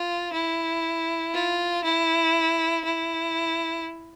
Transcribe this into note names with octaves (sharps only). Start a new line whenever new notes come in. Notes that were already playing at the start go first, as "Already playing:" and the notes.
Already playing: F4
E4
F4
E4
E4